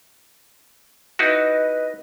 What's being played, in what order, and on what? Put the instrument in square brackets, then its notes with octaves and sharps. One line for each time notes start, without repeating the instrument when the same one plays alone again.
[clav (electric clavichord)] D#4 E4 F#4 [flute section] B4 D#5